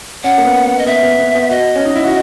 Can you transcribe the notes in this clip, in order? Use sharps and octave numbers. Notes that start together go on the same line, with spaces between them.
C#4 F#5
A#3
B3
B3
D#5
B3 E5
B3
B3
B3
F#4 D#5
C#4
D#4
E4
F#4